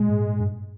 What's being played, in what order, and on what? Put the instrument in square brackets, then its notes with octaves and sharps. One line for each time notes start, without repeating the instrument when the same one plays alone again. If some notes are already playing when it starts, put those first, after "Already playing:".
Already playing: [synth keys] A#2 [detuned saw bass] G#3
[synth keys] G#2
G#2
G2